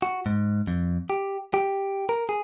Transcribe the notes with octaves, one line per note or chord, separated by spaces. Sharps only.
F#4
G#2
F2
G4
G4
A#4
G#4